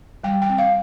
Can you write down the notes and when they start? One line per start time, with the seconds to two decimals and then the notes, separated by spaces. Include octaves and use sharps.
0.24 G3 G5
0.42 G5
0.50 C4
0.58 F5